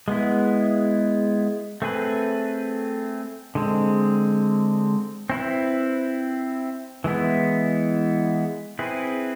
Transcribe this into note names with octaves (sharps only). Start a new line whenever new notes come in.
G#3 B3 E4
A3 C4 G#4 B4
D3 G#3 C4
C4 E4 B4
E3 G#3 B3 E4
C4 E4 G#4 B4